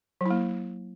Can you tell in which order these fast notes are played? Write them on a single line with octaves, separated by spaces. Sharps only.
F#3 E4 A#3